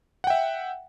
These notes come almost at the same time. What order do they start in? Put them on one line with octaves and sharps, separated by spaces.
F#5 G5 E5